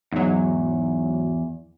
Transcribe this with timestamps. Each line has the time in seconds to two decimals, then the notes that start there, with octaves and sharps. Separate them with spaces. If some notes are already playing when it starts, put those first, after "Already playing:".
0.12 E2 G#2 F#3